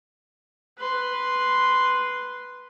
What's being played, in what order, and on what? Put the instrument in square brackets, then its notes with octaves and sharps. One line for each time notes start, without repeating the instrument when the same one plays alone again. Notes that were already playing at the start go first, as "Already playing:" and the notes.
[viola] B4 C6